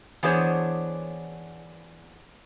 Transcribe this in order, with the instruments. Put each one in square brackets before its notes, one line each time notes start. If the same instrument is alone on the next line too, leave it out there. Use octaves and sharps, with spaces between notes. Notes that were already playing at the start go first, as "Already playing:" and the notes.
[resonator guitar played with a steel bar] E3 B3 D4 G#4 C5 C#5